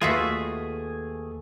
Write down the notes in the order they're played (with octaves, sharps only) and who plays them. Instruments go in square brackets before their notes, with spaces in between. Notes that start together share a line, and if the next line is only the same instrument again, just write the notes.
[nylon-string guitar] D#2 A3 B4 [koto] F4 F#4 E5 [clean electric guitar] G#4